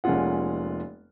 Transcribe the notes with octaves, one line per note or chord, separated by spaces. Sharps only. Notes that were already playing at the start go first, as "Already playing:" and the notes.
F1 G#3 A#3 C#4 F4 F#5